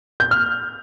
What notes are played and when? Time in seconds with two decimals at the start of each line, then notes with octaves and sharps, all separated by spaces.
0.20 G6
0.31 F6